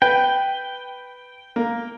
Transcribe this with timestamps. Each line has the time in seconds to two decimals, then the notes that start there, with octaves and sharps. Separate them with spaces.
0.02 B4 G5
1.56 A#3